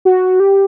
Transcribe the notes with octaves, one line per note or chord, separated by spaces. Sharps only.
F#4
G4